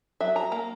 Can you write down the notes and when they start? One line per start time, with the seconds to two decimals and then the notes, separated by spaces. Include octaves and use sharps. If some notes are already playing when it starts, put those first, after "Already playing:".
0.21 F#3 E5
0.36 A#5
0.52 A#3 A#5